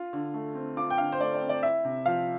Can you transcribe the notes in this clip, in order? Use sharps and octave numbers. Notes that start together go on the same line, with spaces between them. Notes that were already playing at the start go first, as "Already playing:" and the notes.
Already playing: F4
D3
A3
C4
F4 D6
G5
D3 F5
C5
A3 D5
D5
C4
D5
E4 E5
C3
F3 F5